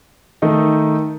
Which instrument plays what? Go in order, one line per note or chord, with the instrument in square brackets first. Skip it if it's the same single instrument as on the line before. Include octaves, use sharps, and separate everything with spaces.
[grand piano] D#3 A3 D#4